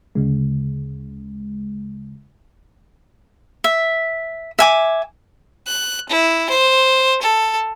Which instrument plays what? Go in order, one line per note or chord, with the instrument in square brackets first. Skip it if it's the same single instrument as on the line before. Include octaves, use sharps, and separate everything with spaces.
[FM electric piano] D2 C#3 G#3
[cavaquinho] E5
E5 G#5 D6
[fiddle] F#6
E4
C5
A4